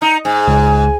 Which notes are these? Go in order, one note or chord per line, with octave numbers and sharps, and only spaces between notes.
D#4 A#5
G#2 G#5
C#2